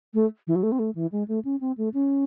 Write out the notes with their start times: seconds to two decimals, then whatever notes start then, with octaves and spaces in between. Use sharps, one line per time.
0.14 A3
0.47 E3
0.55 F#3
0.63 A3
0.72 C4
0.79 A3
0.95 E3
1.12 G#3
1.28 A3
1.45 C#4
1.61 C4
1.77 A3
1.94 C#4